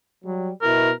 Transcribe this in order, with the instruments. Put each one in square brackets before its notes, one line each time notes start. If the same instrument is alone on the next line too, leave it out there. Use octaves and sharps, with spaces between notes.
[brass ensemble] F#3 G3
[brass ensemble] B2 E4 [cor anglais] A#4